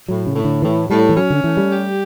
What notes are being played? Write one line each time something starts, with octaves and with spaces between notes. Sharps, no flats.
A2 F#3
C#3
A2
D3
A2 E3
A2 G3
E3
F#3 C#4
D3
E3 A3
G3
G4